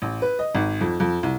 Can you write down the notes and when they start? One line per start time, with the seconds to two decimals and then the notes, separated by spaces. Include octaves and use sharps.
0.02 A1
0.22 B4
0.39 D#5
0.55 G#1
0.81 F2
1.00 F2
1.23 C2